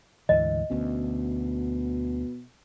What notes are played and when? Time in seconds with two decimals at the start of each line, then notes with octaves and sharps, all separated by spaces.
0.29 D2 G#2 E3 D#5
0.71 D2 B2 C#4